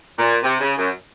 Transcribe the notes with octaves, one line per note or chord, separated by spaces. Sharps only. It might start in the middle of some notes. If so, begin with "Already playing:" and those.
A#2
C3
C#3
F#2